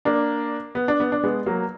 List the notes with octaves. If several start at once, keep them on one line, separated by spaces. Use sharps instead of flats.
A#3 D4
B3
D4
B3
D4
G#3 B3
F#3 A#3